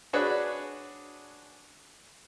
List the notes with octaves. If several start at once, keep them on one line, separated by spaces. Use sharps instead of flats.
D4 F#4 G#4 B4 C#5